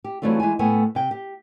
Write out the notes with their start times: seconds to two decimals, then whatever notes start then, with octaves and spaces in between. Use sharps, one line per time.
0.04 G4
0.22 E3 F#3 G3 A3 C4 F4
0.40 E3 G#3 A3 G#5
0.59 A2 A3 B3 G5 G#5
0.95 C3 G5
1.11 G4